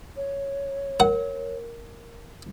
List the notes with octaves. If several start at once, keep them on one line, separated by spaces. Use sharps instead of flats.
C#5
A#4 F#5